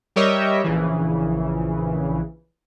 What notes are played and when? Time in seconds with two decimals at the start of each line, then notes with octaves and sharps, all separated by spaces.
0.16 G3 G4 A#4 C#5 D#5 E5
0.64 A#1 C#3 E3